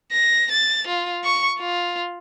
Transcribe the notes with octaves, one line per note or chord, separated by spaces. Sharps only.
A#6
A6
F4
C#6
F4